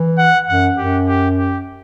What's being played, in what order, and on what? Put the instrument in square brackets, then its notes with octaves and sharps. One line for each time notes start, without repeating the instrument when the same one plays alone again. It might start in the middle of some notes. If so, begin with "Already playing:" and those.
Already playing: [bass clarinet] E3
[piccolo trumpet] F#5
[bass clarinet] F#2 [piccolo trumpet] F#5
[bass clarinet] F#2 [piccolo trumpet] G4
[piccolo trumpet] G4
G4